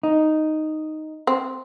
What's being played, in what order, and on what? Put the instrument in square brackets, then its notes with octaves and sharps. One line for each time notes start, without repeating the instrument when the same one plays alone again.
[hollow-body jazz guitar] D#4
[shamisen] C4